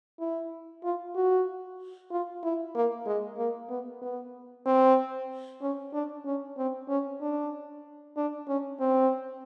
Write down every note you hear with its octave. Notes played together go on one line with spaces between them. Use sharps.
E4
F4
F#4
F4
E4
A#3
G#3
A#3
B3
B3
C4
C#4
D4
C#4
C4
C#4
D4
D4
C#4
C4